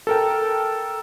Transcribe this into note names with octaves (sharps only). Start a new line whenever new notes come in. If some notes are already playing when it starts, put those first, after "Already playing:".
A4 A#4 G5